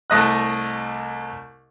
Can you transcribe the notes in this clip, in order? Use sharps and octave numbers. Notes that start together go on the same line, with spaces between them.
C2 A3 D#5 F#6